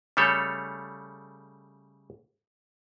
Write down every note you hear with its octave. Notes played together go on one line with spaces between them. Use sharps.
C#3 G3 A3 A4 C#5